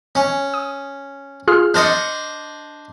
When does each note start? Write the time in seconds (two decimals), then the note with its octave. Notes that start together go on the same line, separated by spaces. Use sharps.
0.15 C#4
0.54 D#6
1.48 F4 G#4 F6
1.74 D4 C5 D#5 F6 A6 C#7